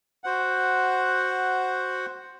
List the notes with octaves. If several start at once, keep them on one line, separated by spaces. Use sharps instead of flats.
F#4 C5 F#5